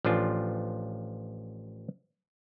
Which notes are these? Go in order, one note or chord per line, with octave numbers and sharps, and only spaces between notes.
A1 F3 D4 F4 C5 G#5